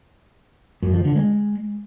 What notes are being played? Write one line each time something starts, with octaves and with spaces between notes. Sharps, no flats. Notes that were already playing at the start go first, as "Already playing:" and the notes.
F#2
F3
D3
G#3